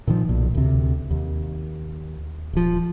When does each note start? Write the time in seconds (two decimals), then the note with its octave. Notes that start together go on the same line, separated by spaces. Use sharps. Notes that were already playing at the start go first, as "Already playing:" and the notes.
0.07 A#2 D#3 F3
0.29 B1 A#2
0.54 D2 C3
1.10 D#2
2.53 D#1 F3